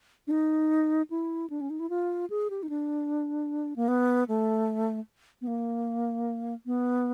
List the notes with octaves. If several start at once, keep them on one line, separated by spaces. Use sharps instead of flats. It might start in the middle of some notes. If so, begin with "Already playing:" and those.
D4
D#4
E4
D4
C#4
D#4
E4
F4
G#4
G4
D#4
D4
A#3
B3
A3
B3
A#3
B3